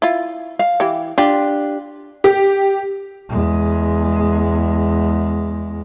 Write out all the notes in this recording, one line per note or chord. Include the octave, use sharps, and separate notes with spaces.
E4 F4
F5
E3 G4
D4 F4 G4
G4
E2 G#3